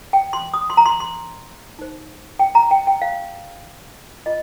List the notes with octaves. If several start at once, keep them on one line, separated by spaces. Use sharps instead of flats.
G5
C6
D#6
C6
A#5
C6
C6
D#4 C5
G5
A#5
G5
G5
F5
F4 D#5